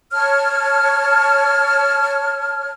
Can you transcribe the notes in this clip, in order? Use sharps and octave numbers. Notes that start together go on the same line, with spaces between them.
C#5 A5 F6